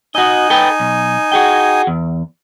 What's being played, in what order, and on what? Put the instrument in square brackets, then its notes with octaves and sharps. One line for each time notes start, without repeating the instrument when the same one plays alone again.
[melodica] D#4 G#5 [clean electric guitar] F#4 D#5
[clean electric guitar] A4 B4 G5
B1
F#4 G#4 G5
E2